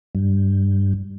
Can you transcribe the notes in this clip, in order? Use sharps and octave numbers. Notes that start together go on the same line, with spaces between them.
G2